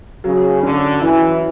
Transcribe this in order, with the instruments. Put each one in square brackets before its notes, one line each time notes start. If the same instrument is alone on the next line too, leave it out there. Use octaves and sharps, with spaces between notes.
[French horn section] C#3 [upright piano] F#3
[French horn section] D3 [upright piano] C#4
[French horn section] E3 [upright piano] E4